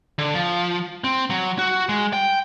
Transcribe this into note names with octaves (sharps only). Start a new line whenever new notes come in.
D3
F3
C4
F#3
F#4
G#3
G5